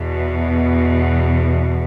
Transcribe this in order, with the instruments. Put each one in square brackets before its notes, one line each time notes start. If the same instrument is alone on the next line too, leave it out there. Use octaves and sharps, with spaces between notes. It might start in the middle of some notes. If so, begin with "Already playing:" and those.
Already playing: [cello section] E2 B2